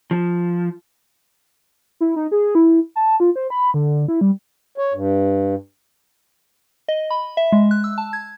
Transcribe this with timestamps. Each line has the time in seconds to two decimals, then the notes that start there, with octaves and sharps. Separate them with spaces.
0.11 F3
2.01 E4
2.16 D#4
2.32 G#4
2.55 E4
2.96 A5
3.20 F4
3.36 C5
3.50 B5
3.74 D3
4.08 E4
4.21 G3
4.78 C#5
4.94 G2
6.88 D#5
7.10 B5
7.37 E5
7.52 G#3
7.71 F#6
7.84 E6
7.98 A5
8.13 G#6